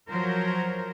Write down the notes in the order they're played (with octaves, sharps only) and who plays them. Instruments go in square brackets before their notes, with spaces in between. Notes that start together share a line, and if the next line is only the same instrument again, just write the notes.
[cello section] F3 F#3 A#4 C5